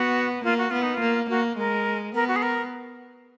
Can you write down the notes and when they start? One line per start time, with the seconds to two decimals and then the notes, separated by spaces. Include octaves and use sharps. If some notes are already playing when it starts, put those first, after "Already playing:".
Already playing: B3 F#4
0.44 A#3 F4
0.58 F#4
0.71 B3 F4
0.82 D#4
0.94 F4
1.00 A#3
1.29 A#3 F#4
1.58 G#3 A#4
2.14 B3 A#4
2.28 F#4
2.36 G#4
2.43 A#4